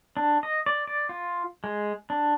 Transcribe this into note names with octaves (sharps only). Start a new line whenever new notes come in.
D4
D#5
D5
D5
F4
G#3
D4